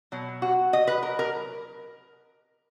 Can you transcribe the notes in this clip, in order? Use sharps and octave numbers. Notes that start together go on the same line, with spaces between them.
B2 F#3
F#4
D#5
B4
A#4
A#4